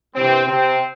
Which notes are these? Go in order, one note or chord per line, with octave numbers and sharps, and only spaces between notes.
G2 C3 E3 G3 C4
C3 C4